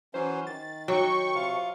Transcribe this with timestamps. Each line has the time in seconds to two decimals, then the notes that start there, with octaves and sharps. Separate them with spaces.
0.14 E3 F#3 C#4 C5
0.47 D#3 A6
0.88 F#3 G5 C#6
1.35 C3 F4 F5